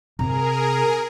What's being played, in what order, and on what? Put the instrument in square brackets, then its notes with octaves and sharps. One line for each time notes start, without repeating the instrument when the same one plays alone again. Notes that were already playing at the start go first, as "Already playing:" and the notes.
[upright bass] C3 [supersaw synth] G#4 A#4 [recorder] A#5